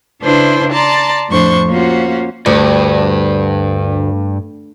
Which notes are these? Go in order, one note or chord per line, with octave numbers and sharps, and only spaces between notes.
C#3 D4 E4 B4 C5 C6
D5 A5 A#5 C6
F2 A2 D4 C5 C#6
A#3 C#4 F4 F#4 C5
D2 G2